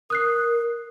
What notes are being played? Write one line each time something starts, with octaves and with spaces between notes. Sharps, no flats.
A#4 D#6 F#6 C7